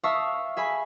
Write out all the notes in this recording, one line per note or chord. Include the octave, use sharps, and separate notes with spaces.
E5 F5 A5 C#6 D#6 E6
G#4 E5 G#5 B5